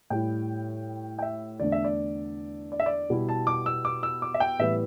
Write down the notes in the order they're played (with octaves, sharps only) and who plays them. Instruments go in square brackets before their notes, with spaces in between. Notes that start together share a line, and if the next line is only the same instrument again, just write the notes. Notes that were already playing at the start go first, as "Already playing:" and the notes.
[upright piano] A2 G3 E4 G5
G5
E5
E2 D3 A3 D4 D5
E5
D5
D5
E5
D5
B2 G3 E4
A5
D6
E6
D6
E6
D6
E5
G5
A2 E3 G3 B3 E5